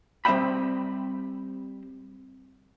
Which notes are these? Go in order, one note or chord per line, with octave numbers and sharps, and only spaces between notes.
G3 C4 D#5 E5 G5 B5